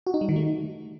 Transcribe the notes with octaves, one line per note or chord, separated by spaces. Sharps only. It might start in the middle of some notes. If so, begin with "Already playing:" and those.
F#4
D#4
G3
D#3
A3